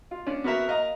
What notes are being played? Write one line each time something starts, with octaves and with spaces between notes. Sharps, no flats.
F4
C#4 D4 D5
B3 F#4 A#4 E5
A#4 D#5 F5 A#5